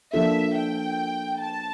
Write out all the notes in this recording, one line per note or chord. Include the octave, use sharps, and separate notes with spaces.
F3 A#3 D4 F4 A4 E5
G5
A5